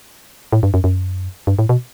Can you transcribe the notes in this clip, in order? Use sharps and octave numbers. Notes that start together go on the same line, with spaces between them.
A2
G2
F#2
F#2
G2
A2
B2